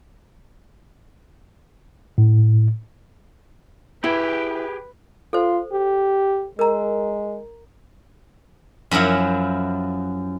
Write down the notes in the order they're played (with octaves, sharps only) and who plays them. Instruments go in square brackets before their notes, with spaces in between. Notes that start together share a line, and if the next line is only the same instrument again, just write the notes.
[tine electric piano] A2
[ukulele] E4 [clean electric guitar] G4 G#4 G5 [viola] B4
[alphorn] F4 [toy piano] A4 C5
[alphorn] G4
[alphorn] G#3 [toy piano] A#4 A#5
[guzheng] F#2 F3 F#3 E4 F#5